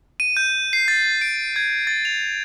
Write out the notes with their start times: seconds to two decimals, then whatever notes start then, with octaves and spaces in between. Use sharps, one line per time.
0.20 D#7
0.37 G6
0.73 C7
0.88 A6
1.21 D7
1.56 G#6
1.87 A6
2.05 F7